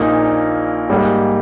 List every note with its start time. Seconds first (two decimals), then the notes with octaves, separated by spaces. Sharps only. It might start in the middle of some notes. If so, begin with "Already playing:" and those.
Already playing: A#1 A#2 A#3 D#4
0.90 G#2 G3 A#3